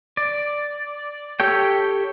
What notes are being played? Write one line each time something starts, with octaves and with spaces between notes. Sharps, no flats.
D5
G4 A4 C#5 G5